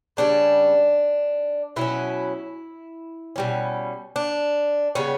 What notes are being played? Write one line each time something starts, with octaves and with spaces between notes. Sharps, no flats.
C#3 E3 G3 C#4 D4
B2 F#3 C#4 E4
B2 G3 C#4
D4
C#3 G3 B3 C#4